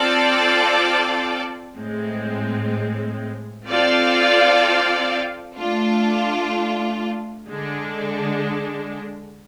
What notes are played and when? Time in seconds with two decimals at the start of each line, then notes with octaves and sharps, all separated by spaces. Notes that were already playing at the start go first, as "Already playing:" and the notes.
Already playing: C4 F4 A4 D5
1.76 A2 G#3 C4
3.67 C4 F4 A4 D5 F5
5.56 A3 D4 F4
7.46 D3 G#3 D4